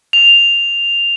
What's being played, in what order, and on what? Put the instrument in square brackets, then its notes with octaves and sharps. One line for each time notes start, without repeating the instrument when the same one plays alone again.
[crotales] F7